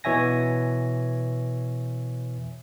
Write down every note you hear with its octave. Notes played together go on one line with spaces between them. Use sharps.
B2 E3 C#5 E5 G#5 A#6